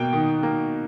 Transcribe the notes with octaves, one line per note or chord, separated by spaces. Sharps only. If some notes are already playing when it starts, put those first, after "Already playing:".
Already playing: B2 A#3 G5
D#3
A#3